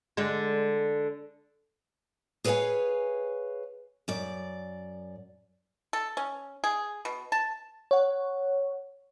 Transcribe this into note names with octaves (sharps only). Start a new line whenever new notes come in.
D3 G#3
G#4 B4 C#5 D#5 F5 G#5
F#2 D5
A4
C#4
G#4
B2
A5
C#5 F#5